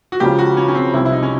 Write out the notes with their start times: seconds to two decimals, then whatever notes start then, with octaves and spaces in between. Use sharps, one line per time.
0.12 F#4
0.20 C#2 C#3 F3 G4
0.38 F#4
0.57 C#4
0.68 C#4
0.75 C4
0.94 C2 C3 F3 E4
1.06 E4
1.12 D#4
1.23 C#4